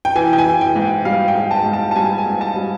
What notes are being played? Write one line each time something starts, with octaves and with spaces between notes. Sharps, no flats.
G5
E3 G#5
G5
G#5
E3
G5
G#2
G3 F5
G5
G#2
A5
G#2
A5
A5
G3 G#5
G#5
G#2
A5
G3